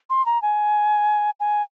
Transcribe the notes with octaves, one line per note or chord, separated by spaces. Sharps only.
C6
A#5
G#5
G#5